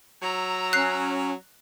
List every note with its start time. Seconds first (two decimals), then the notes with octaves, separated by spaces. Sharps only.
0.22 F#3 A#5 E6
0.73 C#4 F#6 C7